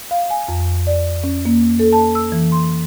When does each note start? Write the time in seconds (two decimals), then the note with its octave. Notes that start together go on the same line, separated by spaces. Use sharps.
0.11 F5
0.30 G#5
0.48 F2
0.87 D5
1.24 C#4
1.45 A#3
1.79 A4
1.93 A5
2.15 E6
2.32 E3
2.52 C6